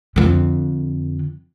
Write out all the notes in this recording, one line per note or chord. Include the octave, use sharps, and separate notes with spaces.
F2 D3